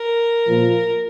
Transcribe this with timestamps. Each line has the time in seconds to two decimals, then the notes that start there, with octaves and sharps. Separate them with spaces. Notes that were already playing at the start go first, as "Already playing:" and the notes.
Already playing: A#4
0.47 A#2 F3 A#3 F4